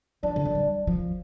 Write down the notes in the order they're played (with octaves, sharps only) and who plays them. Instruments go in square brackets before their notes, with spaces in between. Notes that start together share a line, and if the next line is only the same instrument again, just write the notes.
[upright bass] F3 [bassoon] D4
[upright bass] D3
F3
G3
F3